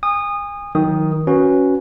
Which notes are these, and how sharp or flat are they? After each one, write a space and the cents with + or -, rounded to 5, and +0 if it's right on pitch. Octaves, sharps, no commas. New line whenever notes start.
G#5 -35 D#6 -20
D#3 +15 F#3 -20 D#6 +0
C#4 +0 F#4 +0 B4 -10